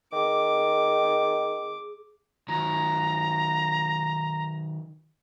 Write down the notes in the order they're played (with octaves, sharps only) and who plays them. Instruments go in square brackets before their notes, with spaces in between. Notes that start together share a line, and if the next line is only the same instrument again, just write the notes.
[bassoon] D#3 [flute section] G#4 [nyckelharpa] D6
[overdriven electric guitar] D#3 F#3 [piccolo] A#5